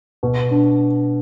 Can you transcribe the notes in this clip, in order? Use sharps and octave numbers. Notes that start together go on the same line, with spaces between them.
B2
D4